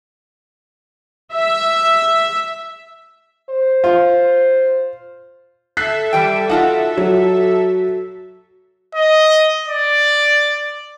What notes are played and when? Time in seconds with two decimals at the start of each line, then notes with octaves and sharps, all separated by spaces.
1.33 E5
3.50 C5
3.84 F4
5.77 A4 E5 F#6 B6 C7
6.13 E3 G3 G5
6.49 D#4 F4 F#4 F#5 A5
6.97 F#3
8.95 D#5
9.68 D5